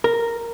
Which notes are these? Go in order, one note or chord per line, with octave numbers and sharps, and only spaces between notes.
A#4